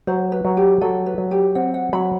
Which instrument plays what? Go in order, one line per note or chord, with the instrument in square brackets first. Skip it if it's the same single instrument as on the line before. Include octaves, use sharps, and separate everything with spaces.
[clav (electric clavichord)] F#3 [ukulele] C5
[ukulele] B4
[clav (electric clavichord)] F#3
[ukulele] G4
[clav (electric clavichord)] F#3 [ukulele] A4
[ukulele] B4
[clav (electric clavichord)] F#3
[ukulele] G4
[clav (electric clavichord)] C4 [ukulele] F#5
[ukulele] F#5
[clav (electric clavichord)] F#3 [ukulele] B5